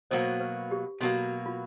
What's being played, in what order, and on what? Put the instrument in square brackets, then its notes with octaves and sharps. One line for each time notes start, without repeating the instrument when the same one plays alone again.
[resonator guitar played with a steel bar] B2 F#3 A#3 [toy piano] C5
[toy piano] B4
G4
[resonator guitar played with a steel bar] B2 F#3 A#3 [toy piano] F#4
[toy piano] F4